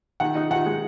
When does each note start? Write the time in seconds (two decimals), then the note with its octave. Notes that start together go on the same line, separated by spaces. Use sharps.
0.20 D#3 F#5
0.35 D#4
0.51 D#3 F#5
0.66 G#3